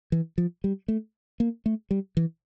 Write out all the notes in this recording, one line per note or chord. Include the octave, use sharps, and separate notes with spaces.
E3
F3
G3
A3
A#3
A3
G3
E3